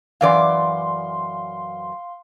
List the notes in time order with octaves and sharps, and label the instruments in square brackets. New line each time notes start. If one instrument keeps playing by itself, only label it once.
[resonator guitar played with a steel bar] F#2 E3 D5 [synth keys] F5 C6